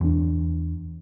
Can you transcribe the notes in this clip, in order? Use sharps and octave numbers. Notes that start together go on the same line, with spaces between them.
E2 D4